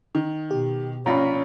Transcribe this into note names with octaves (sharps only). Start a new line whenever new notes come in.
D#3
B2 G4
A#1 C#4 F4 A#5 B5